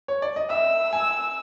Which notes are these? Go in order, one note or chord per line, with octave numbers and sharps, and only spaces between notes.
C#5
D5
D#5
E5 E6
G#5